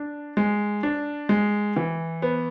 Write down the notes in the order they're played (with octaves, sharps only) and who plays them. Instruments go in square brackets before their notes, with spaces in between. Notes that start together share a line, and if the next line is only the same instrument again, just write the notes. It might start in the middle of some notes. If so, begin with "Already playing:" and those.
Already playing: [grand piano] D4
G#3
D4
G#3
E3
B3